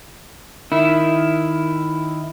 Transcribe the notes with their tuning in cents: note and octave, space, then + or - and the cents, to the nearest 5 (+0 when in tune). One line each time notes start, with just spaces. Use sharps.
D#3 +0 E4 +5